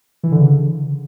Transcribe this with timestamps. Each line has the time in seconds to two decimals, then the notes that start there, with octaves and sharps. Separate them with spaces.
0.23 E3
0.32 D3
0.40 C#3